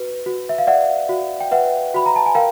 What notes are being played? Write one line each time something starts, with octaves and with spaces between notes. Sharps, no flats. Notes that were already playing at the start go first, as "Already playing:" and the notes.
Already playing: F#4 B4
F#4
E5
F5
D5 E5 F#5
F#4
G5
B4 E5 F#5
F#4 B5
A#5
A5
G#5
A#4 F5 G5